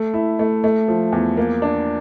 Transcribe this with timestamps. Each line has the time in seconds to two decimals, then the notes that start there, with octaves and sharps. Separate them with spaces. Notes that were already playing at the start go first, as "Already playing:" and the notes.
Already playing: A3
0.14 E4
0.39 A3
0.64 A3
0.88 F3
1.12 E2
1.37 A#3
1.62 D4